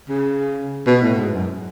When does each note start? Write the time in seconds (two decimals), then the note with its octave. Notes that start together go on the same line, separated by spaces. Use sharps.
0.09 C#3
0.86 B2
1.02 A2
1.18 G#2
1.34 F#2